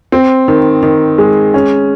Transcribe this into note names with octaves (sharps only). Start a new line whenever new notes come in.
C4
D#3
D#3
G#3
C#4